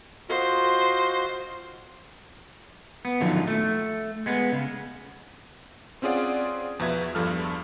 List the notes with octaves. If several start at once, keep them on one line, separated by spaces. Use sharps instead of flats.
F4 F#4 C5 D#5
B3
F#2 A#2 D3 D#3 F3 F#3
A3
G#3 B3
C#3
C4 C#4 F4 G#4 D5 F#5
E2 B2 F3 B4 E5 G#6
E2 G2 F3 A4 F6